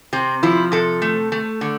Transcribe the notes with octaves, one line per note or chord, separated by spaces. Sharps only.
C3 C4
F3 E4
C3 A4
A3
A3
D3